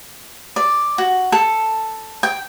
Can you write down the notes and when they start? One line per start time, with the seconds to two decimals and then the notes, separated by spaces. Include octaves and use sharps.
0.56 D5
0.98 F#4
1.32 A4
2.23 G5